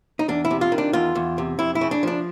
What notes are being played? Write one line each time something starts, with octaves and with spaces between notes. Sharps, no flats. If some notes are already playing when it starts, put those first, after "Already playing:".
D#4
E2 D4
E4
C3
F4
D#3
D4
E2 F4
E2
C3
F2 E4
E4
C#3
D4
F3 D4